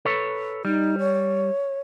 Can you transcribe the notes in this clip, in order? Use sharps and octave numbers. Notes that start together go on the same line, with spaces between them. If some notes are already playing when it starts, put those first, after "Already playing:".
A4 B4 C#5
G3 D#4
C#5